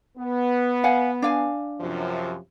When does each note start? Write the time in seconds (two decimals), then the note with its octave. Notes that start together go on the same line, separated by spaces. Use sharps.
0.18 B3
0.84 F5 F#5 G#5
1.22 D4 F5 G#5
1.80 F#2 C3 F3